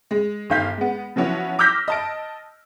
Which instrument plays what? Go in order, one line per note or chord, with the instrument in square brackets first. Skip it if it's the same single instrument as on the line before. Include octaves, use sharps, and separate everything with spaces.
[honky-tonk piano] G#3
G1 D#3 F5 G6 B6
G#3 B3
F3 F#3 B3 C#4 E4 F#4
D6 E6 F6 G6 A#6 B6
D#5 A5 D7